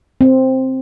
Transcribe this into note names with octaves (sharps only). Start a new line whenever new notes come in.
C4